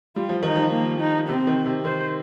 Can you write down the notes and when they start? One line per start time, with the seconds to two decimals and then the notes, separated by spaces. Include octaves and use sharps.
0.16 G3 F4
0.29 F3
0.43 D#3 D#4
0.56 F3
0.72 A#3
1.00 D#4
1.28 C3 C4
1.47 D#3
1.66 C3
1.85 D#3 C5